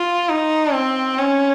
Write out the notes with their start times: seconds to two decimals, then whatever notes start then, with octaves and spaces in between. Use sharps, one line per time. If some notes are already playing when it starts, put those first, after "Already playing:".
Already playing: F4
0.29 D#4
0.74 C4
1.18 C#4